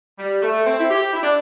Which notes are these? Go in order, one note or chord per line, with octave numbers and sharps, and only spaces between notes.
G3
A3
C4
E4
G4
E4
D4